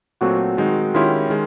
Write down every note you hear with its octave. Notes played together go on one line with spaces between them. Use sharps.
A#2 F#3 A3 C4 F#4
D#3 G#3 C4 D#4
D#3 G#3 C#4 E4 F4 G4
D#3 G#3